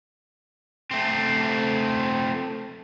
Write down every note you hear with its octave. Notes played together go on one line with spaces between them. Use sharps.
A3 C4